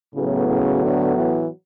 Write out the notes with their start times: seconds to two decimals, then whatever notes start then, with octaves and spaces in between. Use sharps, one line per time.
0.14 A2 C#3 F#3 B3
0.49 C#3
0.83 D3
1.17 E3